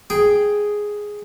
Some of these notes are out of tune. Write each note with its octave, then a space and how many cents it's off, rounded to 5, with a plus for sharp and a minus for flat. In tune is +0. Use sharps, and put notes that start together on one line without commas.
G#4 +0 G5 +5